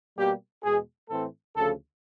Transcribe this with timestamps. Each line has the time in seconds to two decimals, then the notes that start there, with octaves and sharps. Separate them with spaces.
0.17 B2 G3 A#3 G4
0.63 E2 B2 G#3 G#4
1.09 A2 E3 A3 C4 A4
1.55 D2 C#3 F3 A4